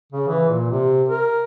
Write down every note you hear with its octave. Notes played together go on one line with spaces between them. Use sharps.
C#3
E3
A#2
C3
A#4